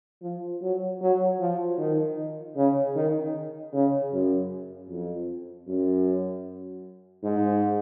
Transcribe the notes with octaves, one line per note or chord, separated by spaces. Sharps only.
F3
F#3
F#3
F3
D#3
C#3
D#3
C#3
F#2
F2
F#2
G#2